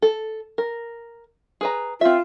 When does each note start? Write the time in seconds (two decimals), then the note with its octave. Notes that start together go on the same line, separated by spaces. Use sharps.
0.02 A4
0.58 A#4
1.61 G#4 B4 A#5
2.01 C4 F4 E5